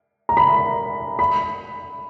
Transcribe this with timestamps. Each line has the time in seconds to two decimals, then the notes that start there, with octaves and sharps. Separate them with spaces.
0.29 A#5
0.37 B5
1.19 B5